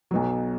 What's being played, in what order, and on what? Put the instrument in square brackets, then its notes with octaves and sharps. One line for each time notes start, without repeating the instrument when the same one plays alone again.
[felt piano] B1 B2 F#3